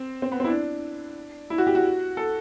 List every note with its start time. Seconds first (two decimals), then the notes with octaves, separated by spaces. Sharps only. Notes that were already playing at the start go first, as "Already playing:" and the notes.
Already playing: C4
0.22 C4
0.32 B3
0.40 C4
0.44 E4
0.48 D4
1.50 E4
1.58 F#4
1.67 G4
1.75 F#4
2.17 A4